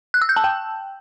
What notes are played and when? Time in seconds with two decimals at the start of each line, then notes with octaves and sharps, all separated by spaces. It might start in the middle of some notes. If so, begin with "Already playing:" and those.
0.14 F#6
0.22 E6
0.29 G6
0.36 A5
0.44 G5